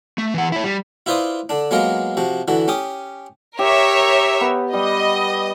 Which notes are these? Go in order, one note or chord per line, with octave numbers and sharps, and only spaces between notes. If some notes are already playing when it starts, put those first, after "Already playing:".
A3
E3 F#5
E4 C#5
G3
E4 F4 B4 C5 D5 D#6
D3 D4
F#3 G#3 A#3 B3 F4 A#4
C3 F3 F#4
D3 E3 F#4
C#4 G4 D6 D#6
G4 A#4 C#5 E5
B3
G3 D#5